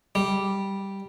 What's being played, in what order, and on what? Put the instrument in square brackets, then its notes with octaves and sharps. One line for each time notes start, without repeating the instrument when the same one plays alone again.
[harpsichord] G3